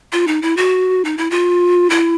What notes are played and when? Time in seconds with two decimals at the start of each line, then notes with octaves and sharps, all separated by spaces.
0.12 F4
0.27 D#4
0.42 E4
0.57 F#4
1.05 D#4
1.18 E4
1.30 F4
1.90 E4